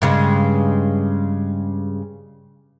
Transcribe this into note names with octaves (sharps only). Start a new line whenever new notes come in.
G2 C#3 G#3